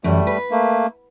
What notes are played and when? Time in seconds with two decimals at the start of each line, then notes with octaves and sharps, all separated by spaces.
0.04 F#2 E3 G3 A3
0.27 B4
0.51 A3 A#3